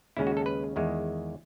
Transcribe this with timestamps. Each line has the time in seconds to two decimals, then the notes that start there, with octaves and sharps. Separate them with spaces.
0.17 D#2 C#3 G#3 C#4 E4
0.27 F#4
0.37 A4
0.46 B4
0.76 E2 D#3 G#3